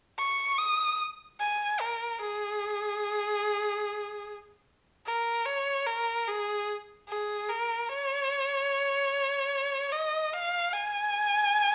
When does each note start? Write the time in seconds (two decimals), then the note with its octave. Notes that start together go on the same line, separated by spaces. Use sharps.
0.19 C#6
0.58 D#6
1.40 G#5
1.80 A#4
2.21 G#4
5.06 A#4
5.46 C#5
5.87 A#4
6.28 G#4
7.08 G#4
7.49 A#4
7.89 C#5
9.92 D#5
10.33 F5
10.74 G#5